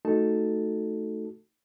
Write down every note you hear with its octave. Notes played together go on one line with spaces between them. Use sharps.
A3 D#4 F#4 A4 A5